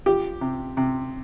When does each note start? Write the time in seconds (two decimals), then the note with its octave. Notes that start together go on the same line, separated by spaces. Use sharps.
0.06 F3 G4
0.41 C3
0.77 C3